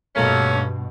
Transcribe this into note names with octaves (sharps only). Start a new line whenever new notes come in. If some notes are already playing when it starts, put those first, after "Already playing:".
G2 B2 A3 A#3 C#4